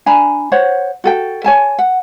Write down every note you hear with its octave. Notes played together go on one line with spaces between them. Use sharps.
D4 G#5 A#5 B5
C5 C#5 F#5
F#4 A4 G5
C#5 G#5 A5
F#5